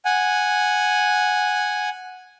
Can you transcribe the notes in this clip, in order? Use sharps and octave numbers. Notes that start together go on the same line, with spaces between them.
F#5 G#5